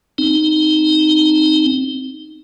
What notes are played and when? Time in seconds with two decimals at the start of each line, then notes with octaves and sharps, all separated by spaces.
0.18 C4 D#4